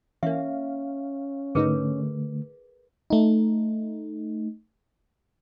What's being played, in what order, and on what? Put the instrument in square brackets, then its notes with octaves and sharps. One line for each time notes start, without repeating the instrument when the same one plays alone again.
[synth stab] E3 A#3 [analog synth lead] C#4 [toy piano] E5 [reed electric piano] F5
[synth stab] G#2 D#4 [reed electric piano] D3 A3 [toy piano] G#4 A#4 B4
[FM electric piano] A3 D#4